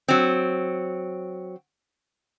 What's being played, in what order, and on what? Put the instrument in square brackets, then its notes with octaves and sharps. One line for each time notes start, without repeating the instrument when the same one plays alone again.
[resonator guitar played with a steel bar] F#3 C4